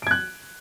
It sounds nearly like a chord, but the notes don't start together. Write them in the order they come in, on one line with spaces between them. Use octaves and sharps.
D7 G#6 F#6